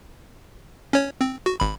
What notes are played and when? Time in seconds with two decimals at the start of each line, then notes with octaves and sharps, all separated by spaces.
0.93 C#4 C#5
1.21 C4
1.46 F#4
1.60 G#1 B5